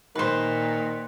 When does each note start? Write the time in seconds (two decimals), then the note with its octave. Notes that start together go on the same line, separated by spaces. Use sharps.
0.15 A#2 D#3 B4 C5